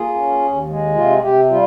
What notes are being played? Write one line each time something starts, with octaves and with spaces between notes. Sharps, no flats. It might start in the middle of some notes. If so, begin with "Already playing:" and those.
Already playing: A#3 F4 G#4
C#4
D#2
G#3
C3 F4
C3 G4
G3 F4